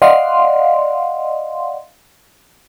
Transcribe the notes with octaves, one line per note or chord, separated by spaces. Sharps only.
D5 D#5 F5 F#5 C6